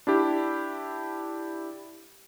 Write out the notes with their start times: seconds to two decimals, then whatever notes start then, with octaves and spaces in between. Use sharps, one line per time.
0.07 D4 E4 G4